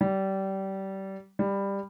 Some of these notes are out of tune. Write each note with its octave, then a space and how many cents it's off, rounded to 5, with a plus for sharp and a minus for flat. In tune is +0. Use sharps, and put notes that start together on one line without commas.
G3 -25
G3 +15